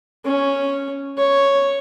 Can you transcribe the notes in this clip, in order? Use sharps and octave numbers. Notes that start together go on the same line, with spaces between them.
C#4
C#5